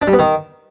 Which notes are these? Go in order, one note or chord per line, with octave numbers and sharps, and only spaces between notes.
D4
G3
B3
D#3